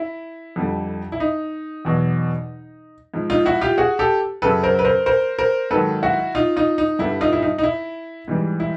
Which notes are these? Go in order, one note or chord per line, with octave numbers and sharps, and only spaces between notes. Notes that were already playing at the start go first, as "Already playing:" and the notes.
Already playing: E4
F2 D3 G3
E4
D#4
E2 B2 F#3
G#2 F3
D#4 F4
E4 F#4
F4 G4
F#4 G#4
G4 A4
F#2 C#3 F#3 A4 B4
A#4 C5
B4
A#4 C5
A#4 C5
A#4 C5
G#2 D#3 F#3 A4 B4
E4 F#4
D#4 F4
D#4 F4
D#4
G2 D3 G3 E4
D#4 F4
E4
D#4
D#4
E4
G#2 E3 G3
E4